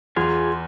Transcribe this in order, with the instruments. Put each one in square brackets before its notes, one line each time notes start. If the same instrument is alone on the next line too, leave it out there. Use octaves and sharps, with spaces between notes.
[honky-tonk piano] E2 [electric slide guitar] F4 G#4